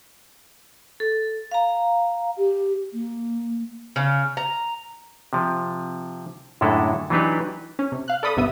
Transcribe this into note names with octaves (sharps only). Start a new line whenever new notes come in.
A4
F5 A#5
G4
A#3
C#3
A#5
C3 F3
F#2 A2 D3 G#3 E4 A4
E3 F#3 D4 D#4 G4 B4
C#4
C3
F5 F#6
A4 D5 B5 D#6
G1 G2 C3 B3 E5 D#6